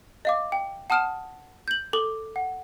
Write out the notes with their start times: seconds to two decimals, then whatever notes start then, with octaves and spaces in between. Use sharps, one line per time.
0.25 D#5 F5 D6
0.52 G5
0.90 F#5 A5 D#6 F6 D7 E7
1.68 G6 F#7
1.93 A4 D6 F#7 G7
2.36 F#5